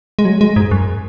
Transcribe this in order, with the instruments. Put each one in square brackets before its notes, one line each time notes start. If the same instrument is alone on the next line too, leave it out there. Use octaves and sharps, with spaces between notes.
[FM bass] G#3
F#3
G#3
G#2
F#2